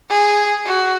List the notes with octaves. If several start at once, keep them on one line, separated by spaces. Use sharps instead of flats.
G#4
F#4